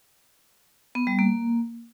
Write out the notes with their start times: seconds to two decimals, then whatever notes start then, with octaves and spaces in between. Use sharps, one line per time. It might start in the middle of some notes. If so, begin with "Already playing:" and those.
0.95 B3
1.07 G3
1.19 A#3